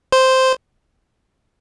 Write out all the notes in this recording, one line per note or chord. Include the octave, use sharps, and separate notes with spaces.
C5